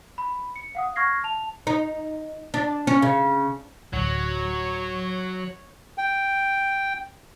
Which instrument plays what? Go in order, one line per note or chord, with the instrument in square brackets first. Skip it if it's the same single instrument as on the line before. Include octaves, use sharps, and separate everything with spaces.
[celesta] B5
C#7
F5 F#5 D#6
C#6 F6 G#6 A#6 C7
A5 F7
[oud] D#4
D4
C#4
C#3
[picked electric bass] D1 [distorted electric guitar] F#3 [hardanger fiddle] C#5
[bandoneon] G5